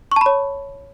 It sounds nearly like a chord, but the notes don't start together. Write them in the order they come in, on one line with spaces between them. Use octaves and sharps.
C#6 A5 B5 C#5